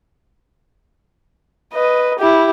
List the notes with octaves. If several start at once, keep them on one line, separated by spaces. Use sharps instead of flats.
B4 D#5
E4 G4